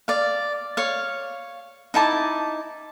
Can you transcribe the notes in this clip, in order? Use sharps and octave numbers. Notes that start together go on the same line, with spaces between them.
D5 F5
C#5 F5
D#4 E4 A5 D6